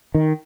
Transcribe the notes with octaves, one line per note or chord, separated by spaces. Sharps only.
D#3